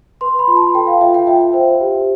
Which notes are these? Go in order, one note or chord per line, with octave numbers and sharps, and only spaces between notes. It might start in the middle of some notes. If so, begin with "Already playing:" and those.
B4 C6
B5
F4
A5
A4 G5
F5
F4 E5
G5
F4 E5
C5
G4